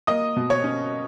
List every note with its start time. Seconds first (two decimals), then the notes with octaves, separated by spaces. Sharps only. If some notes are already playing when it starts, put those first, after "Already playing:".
0.07 A#3 D#5 D#6
0.36 B2
0.50 C#5 C#6
0.64 C#4